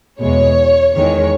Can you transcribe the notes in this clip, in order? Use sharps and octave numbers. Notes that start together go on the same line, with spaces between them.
E2 B2 G#3 C#5
E2 D#3 G#3 C#5